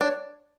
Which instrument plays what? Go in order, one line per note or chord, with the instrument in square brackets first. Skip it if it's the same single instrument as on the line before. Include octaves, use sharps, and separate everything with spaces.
[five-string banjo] D4 [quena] C#5